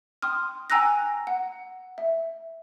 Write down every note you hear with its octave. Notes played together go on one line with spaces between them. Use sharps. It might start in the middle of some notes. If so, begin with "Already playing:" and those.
G5 C6 D#6 F6
G5 G#5 A#5 E6 F#6 A#6
F#5
E5